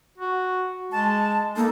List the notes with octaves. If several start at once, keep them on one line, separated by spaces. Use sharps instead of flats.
F#4
G#3 A5
A#3 D#4 A4